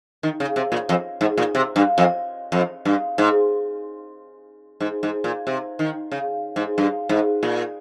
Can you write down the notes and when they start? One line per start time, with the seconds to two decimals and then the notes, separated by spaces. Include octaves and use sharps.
0.23 D#3
0.40 C#3
0.56 C3
0.72 A#2
0.89 F2
1.21 G#2
1.37 A#2
1.55 C3
1.76 G2
1.98 F2
2.52 F2
2.85 G2
3.18 G#2
4.80 G#2
5.03 G#2
5.24 A#2
5.47 C3
5.79 D#3
6.12 C#3
6.56 G#2
6.78 G2
7.09 G#2
7.43 A#2